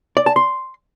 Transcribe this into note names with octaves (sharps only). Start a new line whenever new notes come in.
D5
A5
C6